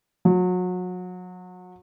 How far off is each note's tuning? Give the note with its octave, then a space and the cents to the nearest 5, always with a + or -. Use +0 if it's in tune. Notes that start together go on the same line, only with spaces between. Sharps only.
F#3 -30